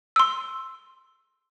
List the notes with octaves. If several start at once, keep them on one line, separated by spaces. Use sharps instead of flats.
C6 E6